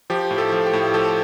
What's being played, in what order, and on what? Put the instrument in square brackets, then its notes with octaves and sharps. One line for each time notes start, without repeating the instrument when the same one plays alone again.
[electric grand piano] F3 G4
A2
A4
F3
G4
A2
F3 A4